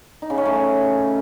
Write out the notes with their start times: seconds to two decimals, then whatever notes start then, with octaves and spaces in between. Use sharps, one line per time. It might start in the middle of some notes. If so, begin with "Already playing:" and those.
0.22 D#4
0.30 C#3
0.38 C#4
0.45 A3